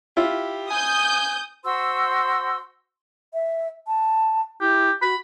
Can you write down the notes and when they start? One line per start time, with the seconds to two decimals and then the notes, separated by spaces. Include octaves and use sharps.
0.17 E4 F4 G4
0.70 G#5 D#6 G6
1.64 F#4 C5 C6 E6
3.34 E5
3.88 A5
4.61 E4 G4
5.02 F#4 B5